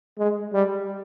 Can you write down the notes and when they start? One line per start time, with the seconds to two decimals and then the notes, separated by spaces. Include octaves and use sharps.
0.19 G#3
0.53 G3